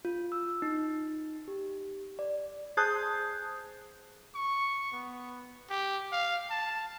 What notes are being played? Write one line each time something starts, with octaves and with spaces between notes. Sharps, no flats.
F4
E6
D#4
G4
D5
G#4 C5 A5 D#6 F#6 G6
C#6
B3
G4
F5
A5